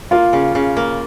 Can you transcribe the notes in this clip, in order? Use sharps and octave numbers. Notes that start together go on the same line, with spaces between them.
A#3 F4
C#3
C#3
A#3